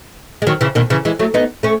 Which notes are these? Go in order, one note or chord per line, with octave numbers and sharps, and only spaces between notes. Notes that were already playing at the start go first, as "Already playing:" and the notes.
G#3
D#3 F#3
C#3 E3
B2 D#3
C#3 E3
E3 G#3
F#3 A3
B3 D#4
A3 C#4